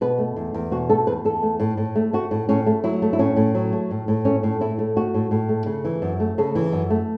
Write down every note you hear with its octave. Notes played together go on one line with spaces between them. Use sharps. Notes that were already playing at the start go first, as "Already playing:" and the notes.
B2 B4
A3
E2
E2
B2 F#4
A3 A4
E2 B4
E2 A4
A3
A2
A2
A3
A3 F#4
A2
A2 C#4
A3
F#3 E4
A3
E4
A2 C#4
A2
F#3
A3
A2
A2
A3 C#4
A2
A2 E4
A3
A3 F#4
A2
A2
A3
C#3
E3
F#2
A3
C#3 A4
E3
F#2
A3